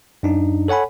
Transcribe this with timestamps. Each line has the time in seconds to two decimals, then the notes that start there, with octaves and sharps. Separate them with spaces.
0.23 F#2 D4 D#4
0.68 A4 C#5 F#5 G#5 B5